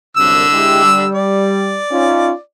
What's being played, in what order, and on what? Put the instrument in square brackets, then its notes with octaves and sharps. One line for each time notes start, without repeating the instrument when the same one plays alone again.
[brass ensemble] C2 F#2 [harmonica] D3 E6
[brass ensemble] G#3 E4 G4
G3
[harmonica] D5
[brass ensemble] C#4 D#4 F4